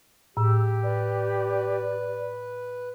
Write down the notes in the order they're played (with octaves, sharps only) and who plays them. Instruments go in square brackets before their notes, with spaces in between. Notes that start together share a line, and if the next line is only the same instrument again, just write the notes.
[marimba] A2 [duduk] G4 [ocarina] E6
[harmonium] B4 [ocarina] D5